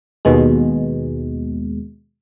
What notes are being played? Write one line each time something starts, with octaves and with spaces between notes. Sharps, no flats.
D#2 B2 G#3